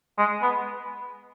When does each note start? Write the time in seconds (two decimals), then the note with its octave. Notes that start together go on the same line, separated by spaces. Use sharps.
0.18 G#3
0.42 B3